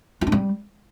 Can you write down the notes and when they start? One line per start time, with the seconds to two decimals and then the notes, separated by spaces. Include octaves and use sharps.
0.21 F4
0.27 D4
0.32 G3